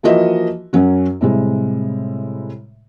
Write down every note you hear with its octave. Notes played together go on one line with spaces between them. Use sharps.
E3 F3 A#3 F#4 D#5 E5
F#2 F#3 C#4 F#4
A2 C3 G3 G#3